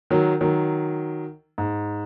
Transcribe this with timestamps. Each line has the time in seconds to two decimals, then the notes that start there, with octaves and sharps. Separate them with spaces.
0.10 D#3 F#3
0.41 D#3 F#3
1.58 G#2